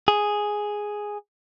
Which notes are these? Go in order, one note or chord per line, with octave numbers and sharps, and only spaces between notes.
G#4